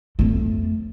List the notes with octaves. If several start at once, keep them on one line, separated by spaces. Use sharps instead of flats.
F2 A3